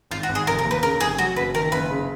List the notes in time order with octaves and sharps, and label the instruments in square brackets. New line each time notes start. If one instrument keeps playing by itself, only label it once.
[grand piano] G#1 [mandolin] F4
[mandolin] F#4
[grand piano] G#1
[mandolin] G#4
[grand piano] F1 [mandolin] A#4
[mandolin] A#4
[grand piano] D#2
[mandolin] B4
[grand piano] C#3 [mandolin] A#4
[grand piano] F1 [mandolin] G#4
[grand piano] F#3 [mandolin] F#4
[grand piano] F#1 [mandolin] B4
[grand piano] D#3 [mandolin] A#4
[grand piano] F#1 [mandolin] B4
[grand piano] C#3